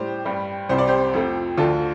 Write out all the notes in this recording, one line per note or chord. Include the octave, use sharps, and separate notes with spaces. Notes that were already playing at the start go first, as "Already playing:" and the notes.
Already playing: A2 G3 G4 C5
G2 G3
C2 C3 G3 C5
D5
G4 C5
F2 F3 A3
D2 D3 A3 F4 A4